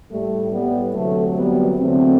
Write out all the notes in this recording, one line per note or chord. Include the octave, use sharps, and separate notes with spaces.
A2 G3 A3
G3 B3
D2 C3 F#3 A3
G3 B3
E2 D3 F#3 A3 C4